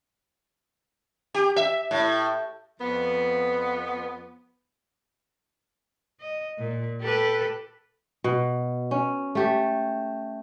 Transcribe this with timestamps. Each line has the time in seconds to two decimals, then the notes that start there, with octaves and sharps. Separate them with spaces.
1.34 G4
1.56 E5
1.91 A2
2.80 F2 F3 B3
6.20 D#5
6.58 A#2
7.02 G4 A4 B4
8.24 B2
8.91 C#4
9.35 A3 G4